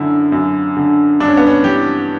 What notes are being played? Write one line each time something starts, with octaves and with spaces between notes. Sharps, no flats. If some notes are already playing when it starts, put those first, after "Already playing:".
Already playing: F#2 D3 E4
F#2
D3
G2 D4
C#4
B3
C#4
E3 G4